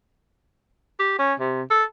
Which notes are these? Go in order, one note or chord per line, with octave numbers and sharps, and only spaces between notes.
G4
C#4
C3
A4